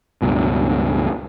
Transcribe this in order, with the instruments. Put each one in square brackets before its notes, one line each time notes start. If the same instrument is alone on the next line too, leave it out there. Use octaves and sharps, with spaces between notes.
[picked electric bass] C#2 G2 B2